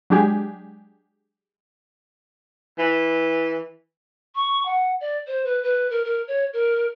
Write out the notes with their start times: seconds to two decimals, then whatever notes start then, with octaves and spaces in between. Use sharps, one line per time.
0.10 F#3 G#3 D4 G4 G#4
2.79 E3
4.35 C#6
4.65 F#5
5.01 D5
5.27 C5
5.45 B4
5.63 B4
5.90 A#4
6.05 A#4
6.28 C#5
6.53 A#4